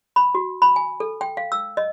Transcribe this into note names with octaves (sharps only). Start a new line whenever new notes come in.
B5
F#4
B5
G#5
A4
G5
F5
E6
D#5